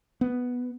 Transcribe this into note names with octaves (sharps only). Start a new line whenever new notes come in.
B3